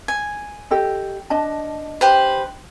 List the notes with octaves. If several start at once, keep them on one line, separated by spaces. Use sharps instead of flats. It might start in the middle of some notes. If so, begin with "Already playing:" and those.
G#5
G4 A4 D#5
D4 D#5 A5
G4 B4 C5